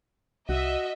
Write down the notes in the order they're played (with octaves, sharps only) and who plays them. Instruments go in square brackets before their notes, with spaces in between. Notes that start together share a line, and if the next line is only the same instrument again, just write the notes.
[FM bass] C2 [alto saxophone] F#4 [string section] D#5 E5